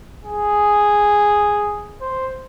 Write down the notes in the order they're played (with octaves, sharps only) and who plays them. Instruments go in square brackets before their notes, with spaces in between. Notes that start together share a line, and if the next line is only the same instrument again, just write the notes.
[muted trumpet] G#4
C5